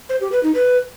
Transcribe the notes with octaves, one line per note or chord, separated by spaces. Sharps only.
C5
G4
B4
D#4
B4